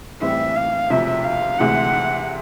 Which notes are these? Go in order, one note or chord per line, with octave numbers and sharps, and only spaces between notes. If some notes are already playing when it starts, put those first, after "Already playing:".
A1 A2 E3 G3 C4 E5
F5
E1 D2 C3 F3 E5
F5
D2 C3 E3 G#3 F#5